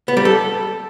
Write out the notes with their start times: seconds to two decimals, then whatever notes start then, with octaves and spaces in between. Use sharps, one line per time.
0.08 B3
0.17 G3
0.25 A4